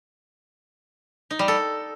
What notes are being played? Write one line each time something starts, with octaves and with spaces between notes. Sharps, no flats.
D#4
G3
A4